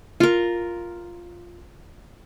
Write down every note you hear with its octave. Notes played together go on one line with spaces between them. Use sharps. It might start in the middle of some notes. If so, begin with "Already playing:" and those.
F4 A#4